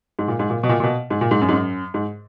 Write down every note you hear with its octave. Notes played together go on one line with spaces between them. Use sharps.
G#2
A#2
G#2
A#2
B2
A#2
A#2
B2
G#2
A#2
G#2
F#2
G#2
F#2
G#2